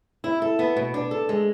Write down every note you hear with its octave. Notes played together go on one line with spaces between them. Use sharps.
E4
A4
B3
B2
D4
A4
G#3